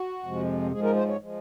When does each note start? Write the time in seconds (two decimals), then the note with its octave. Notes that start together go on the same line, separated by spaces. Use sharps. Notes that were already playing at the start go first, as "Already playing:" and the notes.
Already playing: F#4
0.23 F2 C3 F3 G#3
0.72 G#2 F3 G#3 G#4
0.83 A#4
0.96 C5
1.08 C#5
1.20 F3 G#3